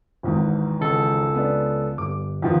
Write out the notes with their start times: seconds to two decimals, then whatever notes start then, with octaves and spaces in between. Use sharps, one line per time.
0.23 G#1 E2 G#2
0.80 C#2 A4
1.35 B3 D4
1.98 G1 D6
2.42 E2 D#3 F3